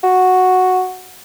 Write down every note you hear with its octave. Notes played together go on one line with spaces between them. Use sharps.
F#4